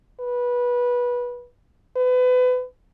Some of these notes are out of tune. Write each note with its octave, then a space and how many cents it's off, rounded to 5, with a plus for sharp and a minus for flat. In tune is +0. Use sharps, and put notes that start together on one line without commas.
B4 -20
B4 +30